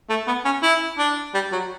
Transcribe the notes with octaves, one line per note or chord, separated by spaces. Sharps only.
A3
B3
C#4
E4
D4
G3
F#3